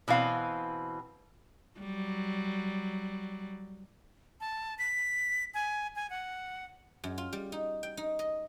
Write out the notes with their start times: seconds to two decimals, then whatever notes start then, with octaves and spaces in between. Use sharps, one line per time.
0.08 B2 E3 C4 F5
1.80 F#3 G3
4.40 A5
4.79 B6
5.54 G#5
5.96 G#5
6.10 F#5
7.04 F#2
7.18 F4
7.33 G3
7.52 D#4
7.83 G5
7.97 D#4
8.19 D#5